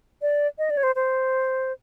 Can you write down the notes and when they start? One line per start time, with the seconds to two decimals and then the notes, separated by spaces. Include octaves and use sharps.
0.22 D5
0.58 D#5
0.70 D5
0.77 C#5
0.83 C5
0.96 C5